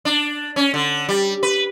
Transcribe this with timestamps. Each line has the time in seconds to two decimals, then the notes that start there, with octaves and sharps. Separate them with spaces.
0.05 D4
0.56 C#4
0.74 D3
1.09 G3
1.43 B4